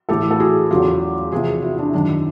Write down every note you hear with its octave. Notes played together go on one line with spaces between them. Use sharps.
A2 E3 G4 A4
A4
F#4 G#4
E2 C#3 F#3 F4 G4
E2 C3 F3 F#4 G#4
E4 F#4
D4 E4
F#2 D#3 F#3 D4 E4